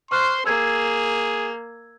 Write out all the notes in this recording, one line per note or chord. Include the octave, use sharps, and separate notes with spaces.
C5 C6 C#6 F6 F#6
A#3 G#4 E6 G#6